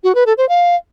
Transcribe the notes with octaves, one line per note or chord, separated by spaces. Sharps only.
F#4
B4
A4
C5
F5